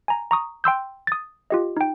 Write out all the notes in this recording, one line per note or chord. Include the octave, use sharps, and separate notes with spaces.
G#5 A#5
A#5 C#6 D#6
G5 C6 E6 G6
D#6 A6
F4 G4 D#5
D#4 G5